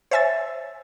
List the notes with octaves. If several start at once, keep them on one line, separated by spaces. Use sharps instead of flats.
C5 C#5 E5 G#5 E6 A6